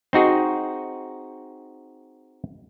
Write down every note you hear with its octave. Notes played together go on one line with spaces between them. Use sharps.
C4 D#4 F#4 G#4